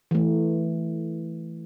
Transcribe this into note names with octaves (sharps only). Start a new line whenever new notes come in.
E3 A3